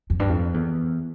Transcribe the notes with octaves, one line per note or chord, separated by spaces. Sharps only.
F2
G2
F2
E2